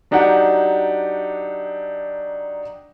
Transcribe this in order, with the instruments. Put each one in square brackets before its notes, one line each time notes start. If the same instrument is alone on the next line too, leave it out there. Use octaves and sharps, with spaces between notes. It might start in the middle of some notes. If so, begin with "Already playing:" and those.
[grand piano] F#3 D4 D#4 G4 F#5